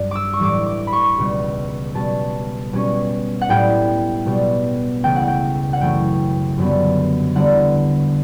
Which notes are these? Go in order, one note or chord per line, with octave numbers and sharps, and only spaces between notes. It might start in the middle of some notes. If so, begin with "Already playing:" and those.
Already playing: G2 G3
D6 E6
C#6
A2 E3 G3 D6
D6
B5
C#6
C#2 B2 G3
B2 G3 C#4 A5
B2 G3 C#4
F#5
A2 G3 B3 G5
B2 G3 B3
C#2 C#3 E3 A3 G5
F#5
G5
F#5
F#2 E3 A3 C#4 G5
F#2 D3 G3 B3
E2 D3 G3 B3 F#5